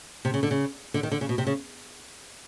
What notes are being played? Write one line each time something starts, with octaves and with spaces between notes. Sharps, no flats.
C3
C#3
D3
C#3
D3
D#3
D3
C#3
B2
C3
C#3